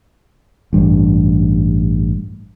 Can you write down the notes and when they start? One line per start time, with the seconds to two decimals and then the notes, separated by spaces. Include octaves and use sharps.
0.73 A1 G2